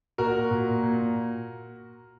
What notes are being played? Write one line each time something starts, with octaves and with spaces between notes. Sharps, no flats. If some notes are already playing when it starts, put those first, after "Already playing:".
A#2 F#4 A#4
A#2
A#2